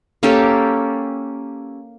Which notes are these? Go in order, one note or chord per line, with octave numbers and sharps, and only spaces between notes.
A#3 C#4 G4 A4